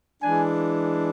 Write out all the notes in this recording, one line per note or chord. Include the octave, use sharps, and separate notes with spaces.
E3 G#3 D4 G#5